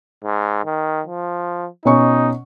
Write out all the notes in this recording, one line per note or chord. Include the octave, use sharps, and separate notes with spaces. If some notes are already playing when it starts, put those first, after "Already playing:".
G#2
D#3
F3
B2 C#4 D#4 C#6